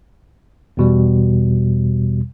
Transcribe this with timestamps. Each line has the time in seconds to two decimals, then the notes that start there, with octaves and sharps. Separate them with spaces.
0.77 E2 B2 G3